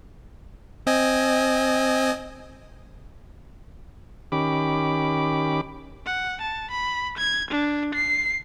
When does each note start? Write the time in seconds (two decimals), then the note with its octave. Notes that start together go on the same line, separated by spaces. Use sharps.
0.87 C4 D#5 G#5
4.32 D#3 C#4 G4 B5 D6
6.06 F#5
6.41 A5
6.71 B5
7.18 G#6
7.51 D4
7.95 C7